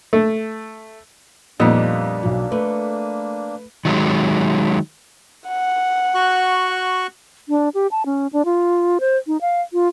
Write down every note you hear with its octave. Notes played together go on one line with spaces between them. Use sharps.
A3
F2 A#2 G3 A#3 B3 D4 D#4
B1 F#3
A3 B4
D#3 F#3 G#3
F#5
F#4 C#6 F#6
D4
G4
A5
C#4
D4
F4
C5
D#4
F5
F4